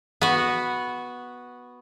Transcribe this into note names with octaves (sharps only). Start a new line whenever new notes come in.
B3 F#4